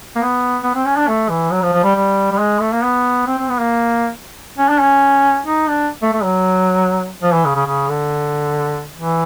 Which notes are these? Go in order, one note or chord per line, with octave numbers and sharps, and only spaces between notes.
A#3
B3
B3
C4
C#4
D4
A3
E3
F#3
F3
F3
G3
G3
G3
G#3
A3
A#3
B3
C4
C4
B3
A#3
C#4
D4
C#4
D#4
D4
A3
A3
F#3
F3
E3
C#3
C#3
C#3
D3
E3